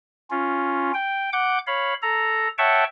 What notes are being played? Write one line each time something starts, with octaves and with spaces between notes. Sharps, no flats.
C#4 F4
G5
F#5 D6 G6
C#5 F5 B5
A4 A#5
C#5 E5 F#5 G5 A5 C#6